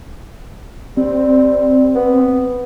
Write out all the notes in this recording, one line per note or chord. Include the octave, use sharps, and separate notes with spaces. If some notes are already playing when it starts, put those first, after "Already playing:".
G3 C4
B3